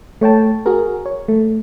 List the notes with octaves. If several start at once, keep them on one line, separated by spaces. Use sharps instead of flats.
A3 C#5 G5 A5
F#4 G#4 A#4
C#5
A3